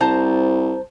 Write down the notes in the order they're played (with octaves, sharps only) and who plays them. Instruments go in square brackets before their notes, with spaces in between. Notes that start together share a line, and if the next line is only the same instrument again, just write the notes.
[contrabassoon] C2 [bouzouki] C5 A5 A#5